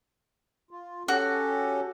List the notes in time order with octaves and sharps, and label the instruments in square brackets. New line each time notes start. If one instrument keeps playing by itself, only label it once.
[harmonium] F4
[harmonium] C#4 G4 A4 [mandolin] F#4